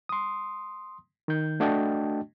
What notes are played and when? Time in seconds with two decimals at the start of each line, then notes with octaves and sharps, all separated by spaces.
0.09 C6 D#6
1.28 D#3 G6
1.60 A3 D4 F#4 D#5 G5 A5